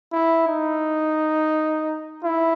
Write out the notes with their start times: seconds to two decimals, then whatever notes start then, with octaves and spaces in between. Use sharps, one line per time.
0.13 E4
0.48 D#4
2.25 E4